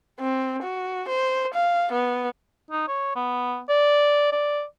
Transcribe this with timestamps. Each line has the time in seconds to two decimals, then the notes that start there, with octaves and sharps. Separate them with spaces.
0.20 C4
0.63 F#4
1.08 C5
1.54 F5
1.92 B3
2.71 D#4
2.88 C#5
3.16 B3
3.69 D5
4.32 D5